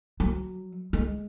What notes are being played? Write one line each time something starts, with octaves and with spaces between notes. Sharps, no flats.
F#3
G#3